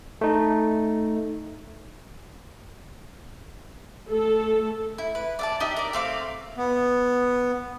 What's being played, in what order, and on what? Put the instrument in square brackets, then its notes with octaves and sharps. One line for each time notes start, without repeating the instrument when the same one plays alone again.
[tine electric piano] A3 D#4
[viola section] A3 A4
[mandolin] E4
B4
D5 E5 A5
D4 D#4 G4 E5
A#4 D5
A3 C4 F5 D6
[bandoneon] B3